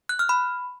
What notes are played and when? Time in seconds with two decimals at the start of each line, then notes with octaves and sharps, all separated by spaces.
0.09 F#6
0.19 F6
0.29 B5